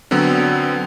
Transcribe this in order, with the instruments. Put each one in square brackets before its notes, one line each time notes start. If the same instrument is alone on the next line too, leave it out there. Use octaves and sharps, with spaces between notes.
[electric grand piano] D3 F#3 B3 C4